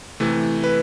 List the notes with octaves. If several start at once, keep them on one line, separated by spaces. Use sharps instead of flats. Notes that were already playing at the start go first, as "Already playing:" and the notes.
C3 E3 A3
B4